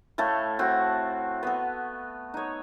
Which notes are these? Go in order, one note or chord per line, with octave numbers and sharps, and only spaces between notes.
A2 A3 A4 F5
C4 F#4
B3 A4
D#4 C#5